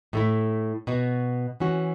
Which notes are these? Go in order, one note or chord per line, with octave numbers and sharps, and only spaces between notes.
A2 A3 E4
B2 B3 F#4
E3 C#4 F#4